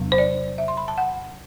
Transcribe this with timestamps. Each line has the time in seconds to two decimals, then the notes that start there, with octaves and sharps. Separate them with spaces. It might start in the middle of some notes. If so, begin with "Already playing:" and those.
Already playing: E2 C3 F#3 B3 D4
0.12 C5
0.18 D5
0.58 E5
0.68 C6
0.77 B5
0.88 A5
0.98 F#5